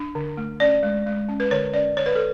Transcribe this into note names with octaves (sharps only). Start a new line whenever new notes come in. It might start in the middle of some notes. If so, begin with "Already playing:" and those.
Already playing: D4
D3
A3
C#4 D5
G#3
G#3
C#4
B4
D3 C#5
C#4 D5
D3 C#5
B4
A4